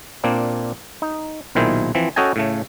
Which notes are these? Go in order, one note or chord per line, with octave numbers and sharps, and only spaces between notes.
A#2 A#3 C4 D4
D#4
B1 A#2 D#3 E4 G#4 C5
E3 F3 C4
C#4 F#4 A4 D#5 G5 G#5
A2 C#3 A3